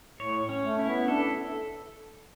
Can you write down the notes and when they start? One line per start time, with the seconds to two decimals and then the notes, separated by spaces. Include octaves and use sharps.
0.20 A2 C#5
0.49 C#4
0.64 A3
0.79 E4
0.86 B3
1.08 D4 A4